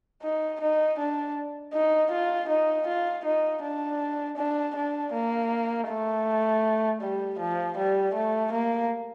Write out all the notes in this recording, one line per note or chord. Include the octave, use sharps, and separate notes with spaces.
D#4
D#4
D4
D#4
F4
D#4
F4
D#4
D4
D4
D4
A#3
A3
G3
F3
G3
A3
A#3